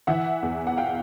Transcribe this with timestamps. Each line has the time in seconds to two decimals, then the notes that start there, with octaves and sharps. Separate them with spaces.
0.07 E3 E5 F#5
0.43 E2
0.67 F#5
0.77 F5 G5